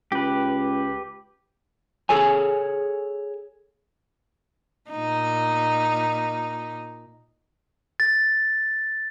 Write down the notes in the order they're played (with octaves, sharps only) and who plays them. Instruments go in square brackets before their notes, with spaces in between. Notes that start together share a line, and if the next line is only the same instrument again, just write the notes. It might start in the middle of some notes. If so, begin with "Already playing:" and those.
[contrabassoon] C#2 [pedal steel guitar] G4 B4
[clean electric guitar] G#4 A4 C#5 G#5
[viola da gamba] A#2 D#4
[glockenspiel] A6